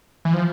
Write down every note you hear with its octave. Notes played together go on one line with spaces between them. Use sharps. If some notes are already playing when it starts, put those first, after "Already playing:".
E3
F3